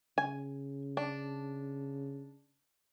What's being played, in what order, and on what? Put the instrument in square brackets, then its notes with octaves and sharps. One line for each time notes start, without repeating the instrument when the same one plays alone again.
[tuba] C#3 [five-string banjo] G#5
[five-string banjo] D4